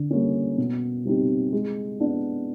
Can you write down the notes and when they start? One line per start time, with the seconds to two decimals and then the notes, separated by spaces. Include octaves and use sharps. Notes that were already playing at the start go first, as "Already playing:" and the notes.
Already playing: D3
0.11 G3 A#3 C#4
0.58 B2
1.05 G3 C4 D#4 G4
1.53 G#3
2.00 B3 D4